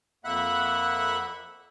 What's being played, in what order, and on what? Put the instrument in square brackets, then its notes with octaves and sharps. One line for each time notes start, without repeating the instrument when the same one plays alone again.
[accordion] F2 A#3 E5 F#5 B5 F#6